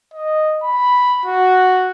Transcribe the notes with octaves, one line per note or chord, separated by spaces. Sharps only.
D#5
B5
F#4